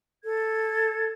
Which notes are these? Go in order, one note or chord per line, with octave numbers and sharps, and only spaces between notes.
A4 G#6